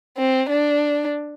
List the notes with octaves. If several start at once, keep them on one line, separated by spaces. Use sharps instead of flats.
C4
D4